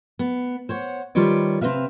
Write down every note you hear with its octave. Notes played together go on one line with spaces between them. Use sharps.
B3
C5 C#5 F#5
D#3 G3 F4 B4 C#5 D5
C3 C4 E4 B4 E5 F5